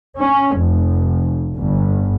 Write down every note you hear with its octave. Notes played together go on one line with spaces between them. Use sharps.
C#4
F1
G1